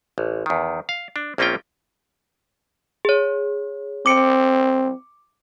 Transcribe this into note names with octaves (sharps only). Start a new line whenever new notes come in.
A1
E2 D#3
F5
D4
A#1 A#3 C4 C#4 F4 G5
G#4 C#5
C4 D6 C#7 D7